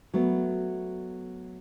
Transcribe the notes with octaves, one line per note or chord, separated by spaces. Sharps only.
F#3 A3 B3